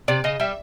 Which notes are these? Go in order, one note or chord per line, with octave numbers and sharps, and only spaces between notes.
C3 D5
C#3 D#5
G3 E5